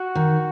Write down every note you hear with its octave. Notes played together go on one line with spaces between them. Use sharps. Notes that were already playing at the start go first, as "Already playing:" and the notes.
Already playing: F#4
D#3